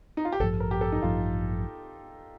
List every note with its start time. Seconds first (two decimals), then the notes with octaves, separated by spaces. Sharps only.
0.17 D#4
0.25 F4
0.32 G4
0.40 A1 G2 F3 A4
0.60 A#4
0.71 G4
0.81 A4
0.92 D#4
1.02 A1 G2 F3 F4